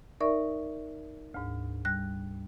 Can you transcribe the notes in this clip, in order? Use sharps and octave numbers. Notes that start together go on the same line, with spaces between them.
D#4 A#4 D5 E5 C#6
D2 G#2
G3 F#6